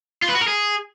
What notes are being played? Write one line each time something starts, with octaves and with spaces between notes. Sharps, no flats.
F4
B4
F#4
A#4
G#4